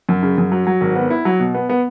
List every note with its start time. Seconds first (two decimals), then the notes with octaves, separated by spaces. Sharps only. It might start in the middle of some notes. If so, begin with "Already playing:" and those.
0.09 F#2
0.22 C#3
0.38 F#2
0.52 F#3
0.67 F#3
0.81 G#1
0.96 B3
1.10 E4
1.25 F#3
1.40 B2
1.54 B3
1.69 B3